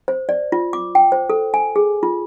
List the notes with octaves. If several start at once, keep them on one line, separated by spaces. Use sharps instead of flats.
C5
D5
F4
D6
G5
C5
A4
G#5
G#4
F4